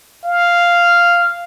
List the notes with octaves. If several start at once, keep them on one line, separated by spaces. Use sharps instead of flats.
F5